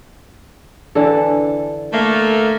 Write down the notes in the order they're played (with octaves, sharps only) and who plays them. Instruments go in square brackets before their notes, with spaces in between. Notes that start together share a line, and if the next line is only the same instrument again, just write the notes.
[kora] D3 E3 A4
[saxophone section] A3 A#3